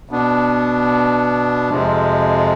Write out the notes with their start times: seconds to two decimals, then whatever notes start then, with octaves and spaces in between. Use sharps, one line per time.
0.09 B2 B3 D4
1.70 F2 C3 F3 G#3